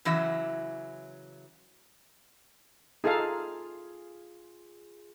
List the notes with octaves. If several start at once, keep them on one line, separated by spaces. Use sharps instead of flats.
C#3 E3 F#3 E5
D#4 F4 G#4 A4 F5